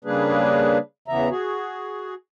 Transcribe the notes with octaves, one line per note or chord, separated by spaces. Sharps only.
C#3 G3 A#3 D4 G#4 B4
E2 C#3 E3 B3 E5 A#5
F#4 G#4